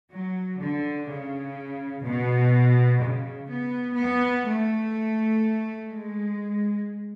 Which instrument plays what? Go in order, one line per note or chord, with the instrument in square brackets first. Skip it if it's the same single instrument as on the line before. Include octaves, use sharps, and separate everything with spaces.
[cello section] F#3
D3
C#3
B2
C#3
B3
B3
A3
G#3